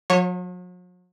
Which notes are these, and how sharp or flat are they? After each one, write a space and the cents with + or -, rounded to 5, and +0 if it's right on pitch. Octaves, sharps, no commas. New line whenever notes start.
F#3 -45 C#5 -15